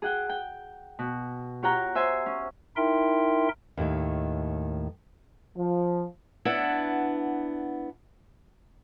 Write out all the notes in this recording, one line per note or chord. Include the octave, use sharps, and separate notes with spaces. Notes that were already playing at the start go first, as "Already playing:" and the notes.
G#4 F#5 G5
G5
B2
F4 G4 C#5 F#5 G5 A#5
C5 E5 G#5 C6
C#4
D#4 E4 A#4 E5 G5 C6
D#2 A2 D#3
F3
B3 D4 E4 F#5